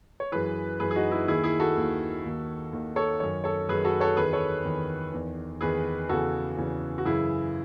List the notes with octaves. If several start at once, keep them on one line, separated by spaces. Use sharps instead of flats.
C#5
F#2 E3 G#4 B4
F#2 E3 G#4 B4
G#4
D#4 F#4
E4 G#4
D#2 D#3 E4 G#4
E4 G#4
F#4 A4
D#2 D#3
D#2 D#3
D#2 D#3
A4 C#5
F#2 D#3 C#5
A4 C#5
F#2 D#3 G#4 B4
F#4 A4
A4 C#5
E2 D#3 G#4 B4
A4 C#5
E2 D#3
E2 D#3
E2 D#3 G#4 B4
E2 C#3 E3 F#4 A4
E2 C#3 E3
F#4
F#2 C#3 E3 E4 G#4